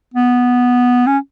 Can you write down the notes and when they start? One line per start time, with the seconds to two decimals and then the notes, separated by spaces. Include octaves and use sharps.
0.14 B3
1.07 C#4